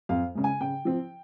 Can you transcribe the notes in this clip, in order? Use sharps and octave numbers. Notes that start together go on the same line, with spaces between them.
F2 F5
C#3 G#3
G#5
C#3 G5
F3 C4